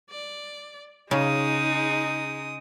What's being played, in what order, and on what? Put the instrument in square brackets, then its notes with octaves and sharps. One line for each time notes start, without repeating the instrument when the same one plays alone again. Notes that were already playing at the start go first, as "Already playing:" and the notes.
[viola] D5
[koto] C#3 [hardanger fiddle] G#3 D#6 [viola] D#4